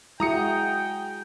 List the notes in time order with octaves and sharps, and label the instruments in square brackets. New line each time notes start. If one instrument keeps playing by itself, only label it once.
[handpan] G#3 F#4 [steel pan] E4 [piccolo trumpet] G5 [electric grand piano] A#5 D#6 C#7